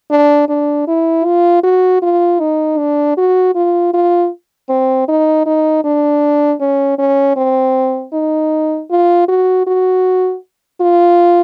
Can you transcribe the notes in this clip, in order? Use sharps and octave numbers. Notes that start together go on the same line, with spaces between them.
D4
D4
E4
F4
F#4
F4
D#4
D4
F#4
F4
F4
C4
D#4
D#4
D4
C#4
C#4
C4
D#4
F4
F#4
F#4
F4